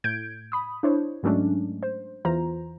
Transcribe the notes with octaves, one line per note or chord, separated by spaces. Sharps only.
A2 G6 G#6 D7
B5 D#6
D4 E4 C5 C#5
G#2 F#3 G#3 A3 C#4 D4
C5
E2 E3 F4 C5 A#5